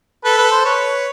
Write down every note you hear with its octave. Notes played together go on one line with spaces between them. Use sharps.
A4 B4
B4
C5
B4 C#5